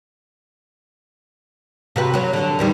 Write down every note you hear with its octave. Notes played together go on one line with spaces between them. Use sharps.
C3 F#4 B4
F#3 F#4
D3
E2 D#3 G3